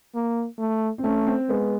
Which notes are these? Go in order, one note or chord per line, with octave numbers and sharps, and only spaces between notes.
A#3
A3
C4
A3 C#4
C4
G#3 B3